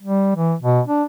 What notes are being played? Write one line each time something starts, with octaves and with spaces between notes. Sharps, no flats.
G3
E3
B2
D4